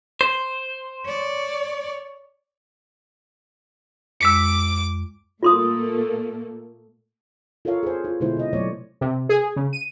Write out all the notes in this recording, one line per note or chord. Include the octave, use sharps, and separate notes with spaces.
C5
C#5 D5
F2 G#3 D6 E6 B6 C#7
A#2 A3 A#3 F4 C6 D#6
F4 A4 A#4 C#5 F5
G#4 C5
F4
B2 D3 G#3 E4 C5
C3 D#5
B2 F#3 A3 C#5 D5
C3
G#4
C#3
D#7